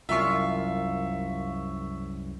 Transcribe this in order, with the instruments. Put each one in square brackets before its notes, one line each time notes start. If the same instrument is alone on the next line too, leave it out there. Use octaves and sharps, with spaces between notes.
[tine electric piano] C2 F#2 C7 [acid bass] F4 [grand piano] E5 C#6